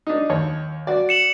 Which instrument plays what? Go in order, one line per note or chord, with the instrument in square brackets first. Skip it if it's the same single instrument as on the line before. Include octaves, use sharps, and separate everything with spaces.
[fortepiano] D4 D#4
D#2 C#5
F#4 D5
[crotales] C#7 E7 F#7